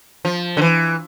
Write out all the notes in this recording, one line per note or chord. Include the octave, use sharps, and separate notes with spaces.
F3
D3
E3